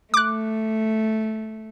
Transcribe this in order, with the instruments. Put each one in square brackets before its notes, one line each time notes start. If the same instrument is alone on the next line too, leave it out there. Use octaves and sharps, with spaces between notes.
[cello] A3 [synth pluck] D6 F#6